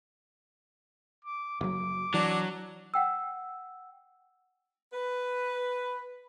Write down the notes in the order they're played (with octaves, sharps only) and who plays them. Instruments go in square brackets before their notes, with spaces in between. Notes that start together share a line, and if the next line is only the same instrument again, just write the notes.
[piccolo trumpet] D6
[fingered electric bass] F#1 F#3 [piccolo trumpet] D6
[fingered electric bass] E3 [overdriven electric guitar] F#3 [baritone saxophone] D4
[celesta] F#5 G5 E6
[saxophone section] B4